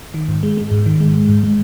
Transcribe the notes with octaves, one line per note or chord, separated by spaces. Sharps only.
D#3
G#2
G#3
G#3
G#2
D#3
G#3
G#3
G#2
G#3